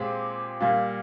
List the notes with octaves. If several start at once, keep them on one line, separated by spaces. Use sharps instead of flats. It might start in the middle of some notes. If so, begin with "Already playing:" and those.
Already playing: A#2 G#3 C4 G4
A#2 G3 A#3